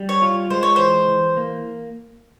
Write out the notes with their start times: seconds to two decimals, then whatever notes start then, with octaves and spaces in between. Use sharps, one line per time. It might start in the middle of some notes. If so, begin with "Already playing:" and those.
Already playing: G3
0.09 C#5
0.22 F4
0.50 G#3 C5
0.63 C#5
0.76 E3 C5
1.08 E3
1.37 A#3